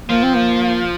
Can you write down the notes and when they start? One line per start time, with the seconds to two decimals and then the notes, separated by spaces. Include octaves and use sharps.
0.09 F3 A#3
0.23 C4
0.36 A#3